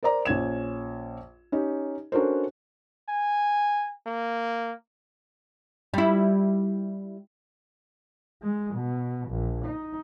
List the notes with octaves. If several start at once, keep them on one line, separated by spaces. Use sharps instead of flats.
A#4 C5 D5 A#5
A#1 C#4 G#6 E7
C#4 D#4 G4
C#4 D4 F#4 A4 A#4 C5
G#5
A#3
G3 E4
G#3
B2
A#1
D#4